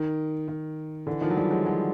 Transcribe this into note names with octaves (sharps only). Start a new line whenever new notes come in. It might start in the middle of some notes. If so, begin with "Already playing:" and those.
Already playing: D#3
D#3
D3 E3
D#3 F3
F#3
F3 G3
F#3 G#3
F#3 G#3